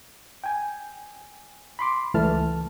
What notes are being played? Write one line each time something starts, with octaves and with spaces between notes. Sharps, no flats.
G5 G#5
B5 C6 D6
C#2 E3 A3 A5 F6